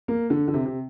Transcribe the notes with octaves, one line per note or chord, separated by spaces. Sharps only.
A#3
D3
D3
C3
C3